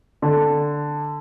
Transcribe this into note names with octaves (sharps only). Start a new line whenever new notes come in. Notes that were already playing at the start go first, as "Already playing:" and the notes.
D3